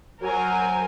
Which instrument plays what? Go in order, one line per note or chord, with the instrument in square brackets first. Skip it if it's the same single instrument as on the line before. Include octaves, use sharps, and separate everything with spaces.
[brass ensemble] F#3 [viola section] A#4 C5 G#5